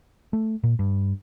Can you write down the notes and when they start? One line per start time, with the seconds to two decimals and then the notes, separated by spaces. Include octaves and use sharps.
0.33 A3
0.64 A#2
0.79 G2